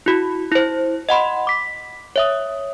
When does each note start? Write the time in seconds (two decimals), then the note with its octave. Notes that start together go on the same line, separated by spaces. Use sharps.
0.06 E4 F#4
0.52 E4 C5
1.09 D#5 F#5 B5 C6
1.47 D6 B6
2.16 C#5 E5 D#6